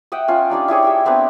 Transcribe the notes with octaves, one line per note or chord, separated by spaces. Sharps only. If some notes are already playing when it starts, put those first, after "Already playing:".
D#5 E5 F#5 G5
C#4 F4
D4 D#4 G4 D5
E4 G4 G#4 C#5
G4 E5 G5
B3 C4 D4 B4